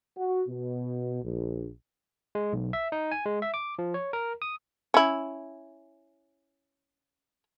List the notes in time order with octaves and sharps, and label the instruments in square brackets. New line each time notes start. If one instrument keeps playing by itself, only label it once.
[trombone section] F#4
B2
A#1
[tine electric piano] G#3
B1
E5
D#4
G#5
G#3
E5
D6
F3
C#5
A#4
D#6
[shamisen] C#4 E4